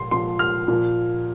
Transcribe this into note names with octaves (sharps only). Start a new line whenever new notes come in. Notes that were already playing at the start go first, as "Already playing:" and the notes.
Already playing: A#2 F3 C6
A#2 F3 C6
F6
A#2 F3